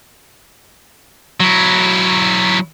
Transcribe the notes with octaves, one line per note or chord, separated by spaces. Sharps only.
F#3 E4